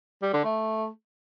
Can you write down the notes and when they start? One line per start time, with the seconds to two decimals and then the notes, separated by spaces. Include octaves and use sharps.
0.22 G3
0.34 D3
0.45 A3